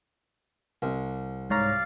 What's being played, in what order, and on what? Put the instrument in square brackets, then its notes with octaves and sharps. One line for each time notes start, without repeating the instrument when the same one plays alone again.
[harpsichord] C2
[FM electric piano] G#2 C#5 A#5 [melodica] D5 F5